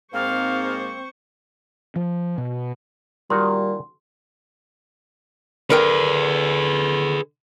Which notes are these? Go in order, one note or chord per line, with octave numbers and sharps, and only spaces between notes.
G#2 A#3 C4 C5 F5 C#6
F3
B2
A#2 D#3 G3 F#4 C6
D3 G#4 A#4 B4 G5